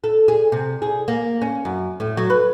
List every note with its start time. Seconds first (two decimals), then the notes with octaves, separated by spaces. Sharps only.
0.04 A4
0.28 G#4
0.52 C3
0.82 G#4
1.08 A#3
1.42 C#4
1.65 F#2
2.00 A2
2.17 F#3
2.30 B4